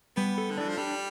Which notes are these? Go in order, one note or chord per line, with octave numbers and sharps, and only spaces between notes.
G3 B3
A4
D3
E3 D4
F3
G3 D4